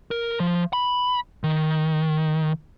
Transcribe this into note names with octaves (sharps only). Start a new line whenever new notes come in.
A#4
F3
B5
D#3